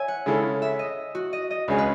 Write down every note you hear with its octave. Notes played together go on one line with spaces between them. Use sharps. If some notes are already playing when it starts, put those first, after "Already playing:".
Already playing: C#5 E5 G#5
F#5
C#3 G#3 C#4 E4 A4
E5
D#5
F#4
D#5
D#5
C#2 C#3 G#3 C#4 G#4
B4